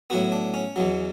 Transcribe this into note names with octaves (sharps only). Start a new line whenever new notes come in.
A2 F#3 B3 F#4
D4
C#4
E2 B2 F#3